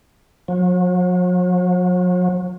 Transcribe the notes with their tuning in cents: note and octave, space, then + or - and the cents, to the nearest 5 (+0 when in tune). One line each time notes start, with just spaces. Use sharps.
F#3 -45